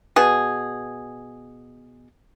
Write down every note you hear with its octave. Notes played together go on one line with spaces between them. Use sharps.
B2 G#4